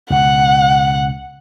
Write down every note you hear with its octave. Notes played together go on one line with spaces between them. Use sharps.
C#2 B2 F#5